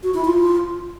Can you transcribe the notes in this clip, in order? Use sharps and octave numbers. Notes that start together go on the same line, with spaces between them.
F#4
E4
F4